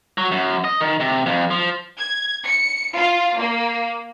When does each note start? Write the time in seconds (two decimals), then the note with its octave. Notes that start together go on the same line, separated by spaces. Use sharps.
0.18 F#3
0.32 F#2
0.64 D#5
0.81 D#3
1.00 C3
1.26 F2
1.51 F3
1.99 G#6
2.45 C#7
2.95 F4
3.37 A#3